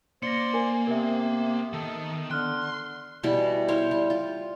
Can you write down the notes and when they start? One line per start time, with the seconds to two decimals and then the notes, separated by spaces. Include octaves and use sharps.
0.23 A#3 C5 D5 C6 A#6 C#7
0.54 A#4 G#5
0.87 C3 B3 A#4 E5
1.73 D#3 A4
2.31 D3 C6 F6 F#6
3.23 B2 E3 G3 E4
3.68 E4 C5 C#5 F5
3.91 G3
4.10 F4